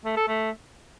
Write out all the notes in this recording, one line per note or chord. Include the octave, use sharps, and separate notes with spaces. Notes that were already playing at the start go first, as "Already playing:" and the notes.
A3
A4
A3